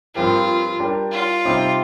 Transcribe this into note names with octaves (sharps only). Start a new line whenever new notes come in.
G2 F3 C4 F4 G4 A#4
G3 D4 G4 A#4
F4
C3 G3 C4 D#4 G4